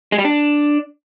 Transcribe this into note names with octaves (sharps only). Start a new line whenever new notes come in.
G#3
G3
D4